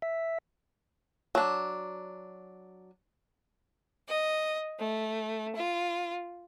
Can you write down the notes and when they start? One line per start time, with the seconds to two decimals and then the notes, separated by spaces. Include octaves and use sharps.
0.02 E5
1.35 F#3 D4
4.08 D#5
4.80 A3
5.55 F4